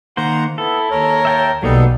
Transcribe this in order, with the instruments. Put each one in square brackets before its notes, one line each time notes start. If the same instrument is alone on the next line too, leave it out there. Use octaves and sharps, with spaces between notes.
[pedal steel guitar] D#3 A#3 C5 [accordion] F#5 A#5
[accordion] B3 [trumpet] E4 [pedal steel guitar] A4
[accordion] D#2 C#5 [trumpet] A#4
[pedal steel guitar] E5 G5 A5
[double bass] B1 B2 [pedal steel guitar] F#3 A#3 B3 [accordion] G3 D#4 A4